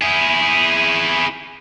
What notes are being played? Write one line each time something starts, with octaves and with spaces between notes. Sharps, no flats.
E4 G#4